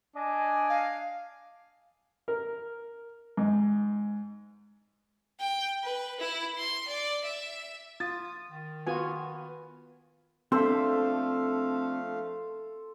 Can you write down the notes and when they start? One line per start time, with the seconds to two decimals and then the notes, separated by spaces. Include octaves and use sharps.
0.16 D4 D5 D#5 G#5
0.69 F5
2.28 A#4
3.37 G#2
5.40 G5
5.84 B4
6.20 E4
6.57 C6
6.88 D5
7.24 E5
8.00 F4 D#6 A6
8.49 D#3
8.87 B3 F4 F#4 G#5
10.52 F3 A3 C4 D4 A4 C5 E5 F5